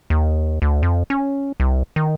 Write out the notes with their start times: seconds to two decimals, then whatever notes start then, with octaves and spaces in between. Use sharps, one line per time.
0.10 D#2
0.62 D2
0.83 F2
1.10 C#4
1.60 C2
1.96 D#3